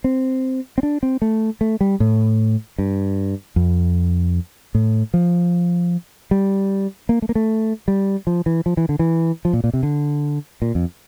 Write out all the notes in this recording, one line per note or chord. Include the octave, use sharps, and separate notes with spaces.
C4
C4
D4
C4
A3
A3
G3
A2
G2
F2
A2
F3
G3
A#3
A3
A#3
A3
G3
F3
E3
F3
E3
D3
E3
F3
A#2
A#2
C3
D3
A#2
F2